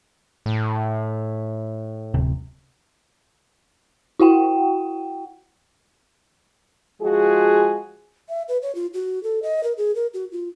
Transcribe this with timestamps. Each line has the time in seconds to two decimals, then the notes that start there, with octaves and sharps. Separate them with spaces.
0.46 A2
2.14 D1 C3
4.19 E4 F#4 F#5 G5
7.01 F3 G#3 F4 F#4 G#4
8.29 E5
8.48 B4
8.62 C#5
8.75 F4
8.94 F#4
9.23 A4
9.43 D#5
9.64 A#4
9.78 G#4
9.95 A#4
10.14 F#4
10.32 F4